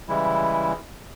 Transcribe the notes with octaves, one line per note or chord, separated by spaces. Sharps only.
C#3 E3 G3 G#3 E4